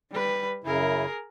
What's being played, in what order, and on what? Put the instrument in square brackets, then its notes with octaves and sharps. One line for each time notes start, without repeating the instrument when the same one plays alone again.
[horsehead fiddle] G3 B4
[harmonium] F#2 C#3 E4 [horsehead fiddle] G#4 A#4